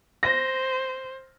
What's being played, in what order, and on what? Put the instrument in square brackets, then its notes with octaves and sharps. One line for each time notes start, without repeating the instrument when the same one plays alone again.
[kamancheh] C5 [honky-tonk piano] A#6